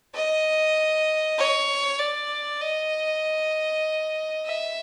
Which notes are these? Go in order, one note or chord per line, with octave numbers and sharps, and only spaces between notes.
D#5
C#5
D5
D#5
E5